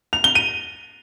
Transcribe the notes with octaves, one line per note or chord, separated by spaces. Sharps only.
F7
G7
D#7